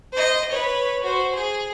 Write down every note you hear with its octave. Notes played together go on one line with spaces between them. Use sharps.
C5 D#5
B4 C#5
F#4 C5
G#4